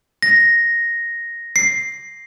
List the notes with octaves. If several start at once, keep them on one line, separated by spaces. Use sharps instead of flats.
A#6
C7